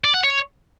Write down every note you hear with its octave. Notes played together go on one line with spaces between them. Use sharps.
D5
F#5
C#5